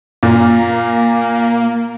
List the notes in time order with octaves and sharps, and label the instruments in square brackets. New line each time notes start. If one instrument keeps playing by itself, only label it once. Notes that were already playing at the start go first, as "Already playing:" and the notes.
[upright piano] A#2 [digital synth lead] A#3